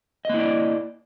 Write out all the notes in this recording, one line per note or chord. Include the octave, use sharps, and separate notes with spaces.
A#3 E4 D5 D#5